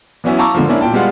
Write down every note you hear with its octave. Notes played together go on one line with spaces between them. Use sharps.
E3 F#3 B3 C#4 E4
F5 A5 A#5 C#6 D6 E6
G#2 D3 F3
A#3 C#4 D4 E4
A#2 G5 A5
G3 G#3 B3 F4 F#5